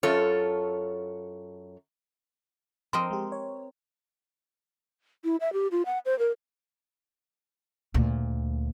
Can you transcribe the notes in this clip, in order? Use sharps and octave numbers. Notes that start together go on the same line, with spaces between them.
F#2 F4 A4 C#5
F3 C4 A#4 D#5 C6
G#3 G4
C#5
E4
E5
G4
F4
F#5
C5
A#4
D2 A#2